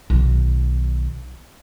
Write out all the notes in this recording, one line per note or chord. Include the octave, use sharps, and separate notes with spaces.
B1 D#3